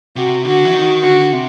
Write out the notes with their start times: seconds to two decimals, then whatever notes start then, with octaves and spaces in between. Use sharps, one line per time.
0.16 C3 F#4
0.45 D3 F#4
0.65 E3
0.74 D#3
1.03 D3 F#4
1.32 C3